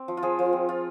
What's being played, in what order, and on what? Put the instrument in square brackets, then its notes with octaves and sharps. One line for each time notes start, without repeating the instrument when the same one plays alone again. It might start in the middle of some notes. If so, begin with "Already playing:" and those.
Already playing: [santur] C4
F3
F4
F3 G#4
F3
C4
F4